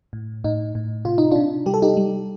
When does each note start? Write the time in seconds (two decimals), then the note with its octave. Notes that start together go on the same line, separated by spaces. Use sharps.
0.13 A2
0.44 A2 D#4
0.75 A2
1.05 C3 F4
1.18 D#4
1.31 C3 D4 F4
1.66 G3 G4
1.74 A4
1.82 D#4 G4
1.97 G3